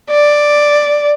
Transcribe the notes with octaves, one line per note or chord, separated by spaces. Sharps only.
D5